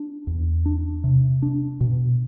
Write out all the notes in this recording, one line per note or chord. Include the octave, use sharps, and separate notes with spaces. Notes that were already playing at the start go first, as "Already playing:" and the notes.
Already playing: D4
E2
D4
C3
D4
B2